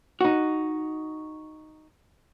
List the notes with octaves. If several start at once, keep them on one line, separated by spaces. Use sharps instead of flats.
D#4 F#4